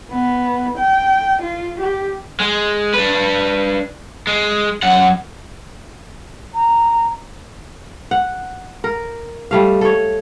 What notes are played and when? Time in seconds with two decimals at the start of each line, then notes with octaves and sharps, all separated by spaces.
0.11 B3
0.78 G5
1.42 F4
1.80 G4
2.40 G#3
2.94 D4 B4
4.27 G#3
4.83 F#2 F#5
6.54 A#5
8.11 F#5
8.84 A#4
9.51 G3 A3 F5
9.81 A4 C#5